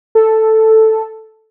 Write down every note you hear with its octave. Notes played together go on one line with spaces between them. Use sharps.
A4